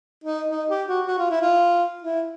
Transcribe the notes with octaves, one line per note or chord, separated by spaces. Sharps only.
D#4
D#4
G4
F#4
F#4
F4
E4
F4
E4